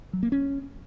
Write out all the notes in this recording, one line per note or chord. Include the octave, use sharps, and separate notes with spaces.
F#3
A#3
C#4